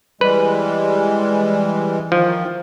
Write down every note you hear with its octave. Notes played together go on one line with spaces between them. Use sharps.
E3 G3 G#3 B4
D#3 F3